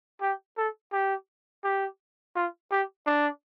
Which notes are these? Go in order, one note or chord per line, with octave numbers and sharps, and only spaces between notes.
G4
A4
G4
G4
F4
G4
D4